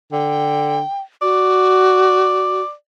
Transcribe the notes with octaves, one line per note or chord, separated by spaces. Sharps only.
D3 G5
F#4 D5